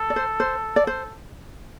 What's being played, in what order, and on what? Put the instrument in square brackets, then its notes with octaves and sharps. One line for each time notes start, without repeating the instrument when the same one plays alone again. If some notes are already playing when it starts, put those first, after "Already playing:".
Already playing: [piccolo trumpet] A4
[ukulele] D5
C5
C5
D5
C5